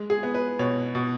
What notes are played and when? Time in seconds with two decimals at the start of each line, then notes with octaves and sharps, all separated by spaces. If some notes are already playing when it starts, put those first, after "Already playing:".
Already playing: G#3
0.10 G#4
0.23 B3
0.34 B4
0.59 B2 C#5
0.95 B2